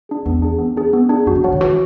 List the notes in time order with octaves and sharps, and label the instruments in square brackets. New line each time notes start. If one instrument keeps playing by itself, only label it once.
[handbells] D4 G#4
[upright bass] E2 [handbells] B3
[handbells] D4 G#4
B3
D4 G#4
B3
D4 G#4
[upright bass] F#2 [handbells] F#4
[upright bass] C#3
[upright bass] E3 [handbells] C#5 F#5 A5
[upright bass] D3
[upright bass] E3 [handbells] F#4